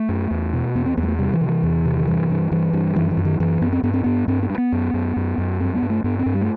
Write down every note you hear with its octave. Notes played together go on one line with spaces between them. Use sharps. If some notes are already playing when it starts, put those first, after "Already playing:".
Already playing: A3
F#2
E2
B2
E2 B3
C4
E2 B3
G3
A3
C3 G3
E3
C3
E3
E2
C3
D#3
G2 E3
G2
G2 E3
G2
F#2 E3
E3
F#2
D#3
F#2 E3
F#2 B3
C4
G2 B3
C4
G2 B3
G2 C4
B3
G2
B3
F#2
F#2
F#2
F#2
G2 C4
B3
G2
A3
G2 B3
C4
G2
G3
A3